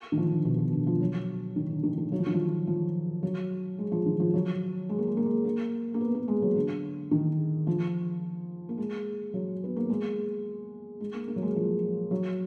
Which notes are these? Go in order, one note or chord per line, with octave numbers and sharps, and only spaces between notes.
D#3
F3
D3
B2
B2
D3
F3
F#3
D#3
D3
D#3
D#3
F#3
F3
D#3
F3
F3
F#3
G#3
F3
D#3
F3
F#3
G#3
A#3
G#3
A#3
G#3
A#3
A#3
B3
A#3
G#3
F#3
D3
D#3
F3
A#3
G#3
F#3
B3
A#3
G#3
G#3
A#3
A#3
F#3
G#3
F3
F#3